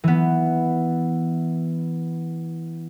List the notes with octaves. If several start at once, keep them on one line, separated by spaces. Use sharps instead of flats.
E3 B3